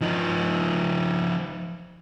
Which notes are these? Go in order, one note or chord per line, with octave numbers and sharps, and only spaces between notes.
F3 D#4